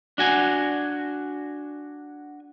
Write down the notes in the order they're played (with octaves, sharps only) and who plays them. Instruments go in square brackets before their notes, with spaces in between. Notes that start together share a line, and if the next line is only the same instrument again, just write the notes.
[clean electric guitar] D4 F#4 G#5